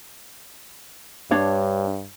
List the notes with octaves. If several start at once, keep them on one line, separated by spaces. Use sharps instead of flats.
G2 D4 C#5